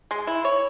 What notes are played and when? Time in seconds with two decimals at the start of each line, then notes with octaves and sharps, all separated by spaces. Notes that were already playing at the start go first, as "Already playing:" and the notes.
0.11 G#3
0.27 E4
0.45 C#5